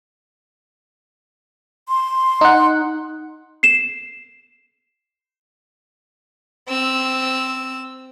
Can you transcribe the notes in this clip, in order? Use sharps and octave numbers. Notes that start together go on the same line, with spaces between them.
C6
D#4 F#5
C7 E7
C4 E6